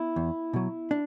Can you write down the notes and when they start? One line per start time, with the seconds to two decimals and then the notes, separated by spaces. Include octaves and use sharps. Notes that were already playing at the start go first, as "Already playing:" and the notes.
Already playing: B3 E4
0.16 E2
0.53 B2 F#3
0.91 D4